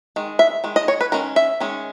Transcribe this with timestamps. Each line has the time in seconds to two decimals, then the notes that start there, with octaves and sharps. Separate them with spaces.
0.16 D#3 G#3
0.39 E5
0.64 D#3 G#3
0.76 D#5
0.88 C#5
1.01 B4
1.12 D#3 G#3 C#4 A#4
1.36 E5
1.60 D#3 G#3 C#4